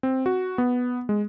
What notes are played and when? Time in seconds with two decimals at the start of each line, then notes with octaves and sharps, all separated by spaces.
0.03 C4
0.26 F#4
0.58 B3
1.09 G#3